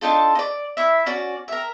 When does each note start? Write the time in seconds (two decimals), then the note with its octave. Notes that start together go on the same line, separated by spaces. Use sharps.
0.01 D4 D#4 F4 A4
0.35 D5 D#5
0.77 E4 E5
1.06 C#4 F#4 D5
1.48 A#4 E5